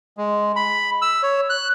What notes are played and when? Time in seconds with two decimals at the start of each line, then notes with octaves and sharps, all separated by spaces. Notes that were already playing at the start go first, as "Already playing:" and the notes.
0.17 G#3
0.56 B5
1.02 E6
1.23 C#5
1.50 F#6